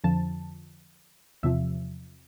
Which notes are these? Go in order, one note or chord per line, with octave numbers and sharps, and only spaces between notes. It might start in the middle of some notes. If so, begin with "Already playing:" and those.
F2 D3 F3 A5
E2 C3 F3 E5